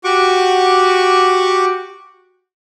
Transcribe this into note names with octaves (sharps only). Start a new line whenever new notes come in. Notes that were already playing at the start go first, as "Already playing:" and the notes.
F#4 G4 F#5 C#6 D6